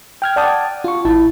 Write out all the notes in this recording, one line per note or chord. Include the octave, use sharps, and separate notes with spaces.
G5 F6 G#6
D5 F#5 G5 A5 D6 D#6
F4 C#6
A1 E4 A5